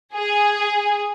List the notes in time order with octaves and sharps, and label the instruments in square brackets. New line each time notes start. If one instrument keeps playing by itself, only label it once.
[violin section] G#4